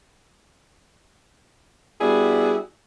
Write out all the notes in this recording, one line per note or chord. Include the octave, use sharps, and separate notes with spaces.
G3 B3 D4 E4 F#4 G#4